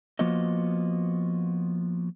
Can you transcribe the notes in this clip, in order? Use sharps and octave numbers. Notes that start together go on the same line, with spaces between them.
F3 A#3 B3 F4 F#4 D#5